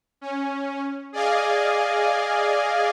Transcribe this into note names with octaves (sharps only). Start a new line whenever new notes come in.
C#4
G#4 D5 D#5 F5 G#5